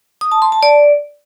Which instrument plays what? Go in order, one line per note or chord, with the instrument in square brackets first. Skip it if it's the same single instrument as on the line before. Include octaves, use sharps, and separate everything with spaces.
[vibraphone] D#6
A5
C6
A5
D5